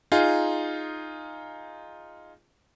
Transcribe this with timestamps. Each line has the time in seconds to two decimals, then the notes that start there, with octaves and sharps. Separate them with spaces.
0.12 D#4 F4 G#4